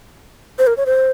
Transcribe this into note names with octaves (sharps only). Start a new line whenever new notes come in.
C5
A#4
C#5
C5